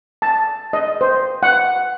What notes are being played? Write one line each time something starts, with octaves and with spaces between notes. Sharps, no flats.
A5
D#5
C5
F#5